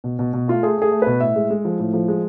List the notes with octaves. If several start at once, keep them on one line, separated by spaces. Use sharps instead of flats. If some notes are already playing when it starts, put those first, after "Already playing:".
B2
B2
B2
A3 F4
A3 G#4
A3 G#4
A3
B2 B4
A2 E5
G#3
G#3
F3
A2
F3
G#3